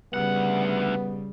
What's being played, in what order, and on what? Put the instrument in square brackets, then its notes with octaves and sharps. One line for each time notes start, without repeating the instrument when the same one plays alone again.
[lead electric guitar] D2 F#5 [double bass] C#3 G3 [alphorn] B3